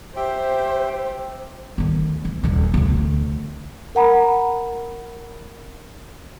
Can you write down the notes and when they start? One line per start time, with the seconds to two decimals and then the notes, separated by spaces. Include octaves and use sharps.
0.16 G4 C5 E5 G5
1.78 D2 D#3
2.25 E3
2.44 D#1 D#4
2.74 D2 D3
3.95 A#4 F#5 A#5 B5